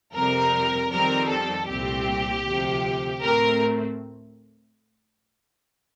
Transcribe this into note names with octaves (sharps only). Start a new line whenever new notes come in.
F2 C3 G3 C4 A#4
F2 D#3 G3 C4 A#4
A4
C2 A#2 A3 C4 G4
D2 C3 F3
A2 A3 C4 A#4